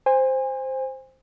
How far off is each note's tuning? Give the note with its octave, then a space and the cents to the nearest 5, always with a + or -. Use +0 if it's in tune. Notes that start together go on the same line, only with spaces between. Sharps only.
C5 +0 G#5 -35